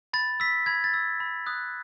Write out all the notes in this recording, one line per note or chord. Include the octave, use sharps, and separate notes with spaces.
B5 A6
E6 B6
B5 G#6
A6
E6
B5
D#6 F#6